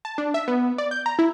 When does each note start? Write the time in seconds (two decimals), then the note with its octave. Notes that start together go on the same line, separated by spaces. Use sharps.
0.05 A5
0.18 D4
0.34 E5
0.48 B3
0.78 D5
0.91 G6
1.06 A#5
1.19 E4